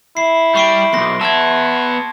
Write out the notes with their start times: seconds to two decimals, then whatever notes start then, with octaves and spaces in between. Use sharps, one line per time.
0.17 E4 C7
0.56 G3 C#6 C7 D7
0.93 B1 E2 C6 A#6
1.21 B3 E5 A5 G#6